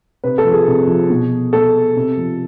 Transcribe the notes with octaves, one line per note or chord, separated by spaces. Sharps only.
C3 B4
A4
F3
G#4
C3
F3
B2
B2 A4
C3
F3